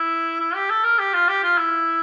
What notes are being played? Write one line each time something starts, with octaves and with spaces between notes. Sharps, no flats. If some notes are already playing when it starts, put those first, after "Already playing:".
Already playing: E4
E4
G4
A4
A#4
G4
F4
G4
F4
E4